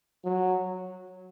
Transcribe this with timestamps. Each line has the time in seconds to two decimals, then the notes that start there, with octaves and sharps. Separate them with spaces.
0.25 F#3